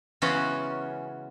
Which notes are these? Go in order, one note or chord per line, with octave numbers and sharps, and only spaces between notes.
C#3 E3 G#3 B3 C#4 F#4